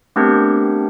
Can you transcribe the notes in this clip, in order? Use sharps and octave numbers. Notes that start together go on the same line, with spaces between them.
A3 B3 C4 D4 G4 A#4